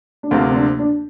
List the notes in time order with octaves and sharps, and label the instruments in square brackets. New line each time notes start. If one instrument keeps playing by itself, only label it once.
[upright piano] D4
[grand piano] D2 C3 F3 A#3 F4 [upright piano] C4
[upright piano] C4
D4
D4